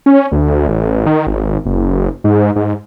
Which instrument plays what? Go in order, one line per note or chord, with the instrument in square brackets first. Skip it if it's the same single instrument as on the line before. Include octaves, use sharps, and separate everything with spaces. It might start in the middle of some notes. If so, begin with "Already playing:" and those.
[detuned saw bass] C#4
D2
A1
D#3
G#1
F#1
G#2
G#2